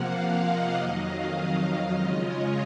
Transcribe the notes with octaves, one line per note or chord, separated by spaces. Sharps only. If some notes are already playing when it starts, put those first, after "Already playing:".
Already playing: C3 F3 A#3 F5 F#5
D#5
F2 D#3 F#3 D#5
F5
D#5
C#3 G#3 C#4 F4
C#5